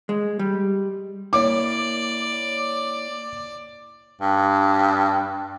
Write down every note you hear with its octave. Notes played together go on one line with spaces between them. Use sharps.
G#3
G3
A#3 E4 C#5 D5 D6
G2